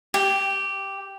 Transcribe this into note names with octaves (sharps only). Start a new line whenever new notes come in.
G4